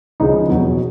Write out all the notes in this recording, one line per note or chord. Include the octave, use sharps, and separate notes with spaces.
C#2 C#3 F3 D#4
E2 B2 F#3